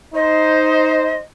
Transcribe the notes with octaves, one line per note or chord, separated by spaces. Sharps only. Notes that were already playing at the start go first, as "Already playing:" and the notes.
D#4 C5 D#5